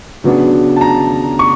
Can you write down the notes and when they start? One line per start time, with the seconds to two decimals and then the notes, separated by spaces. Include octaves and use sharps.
0.24 C#3 F#3 B3 D4
0.76 A5
0.81 A#5
1.39 C#6